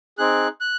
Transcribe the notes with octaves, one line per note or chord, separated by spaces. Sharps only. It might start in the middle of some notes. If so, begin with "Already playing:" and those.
C4 D#4 G#4 F#6
F#6